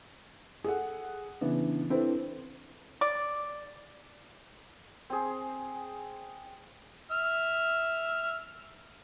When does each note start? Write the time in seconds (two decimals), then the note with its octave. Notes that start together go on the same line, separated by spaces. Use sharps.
0.64 G#4 A4 F#5
1.41 C#3 E3 B3 D4
1.90 C4 D4 E4 A4 B4 C5
3.01 D5
5.10 C4 G#4
7.11 E5 F6